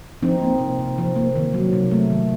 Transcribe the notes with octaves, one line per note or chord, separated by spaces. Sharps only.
F3 C4 D#4
A#3
C3
C3
F3
A#3
D#3
F#3
C3
A3
D#3